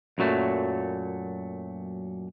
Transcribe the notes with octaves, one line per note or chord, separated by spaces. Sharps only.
F#2 A#2 F#3 A3